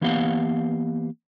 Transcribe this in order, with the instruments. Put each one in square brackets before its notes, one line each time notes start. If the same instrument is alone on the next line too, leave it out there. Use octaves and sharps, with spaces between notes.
[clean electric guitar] E3 A#3 B3 G4 F5 F#5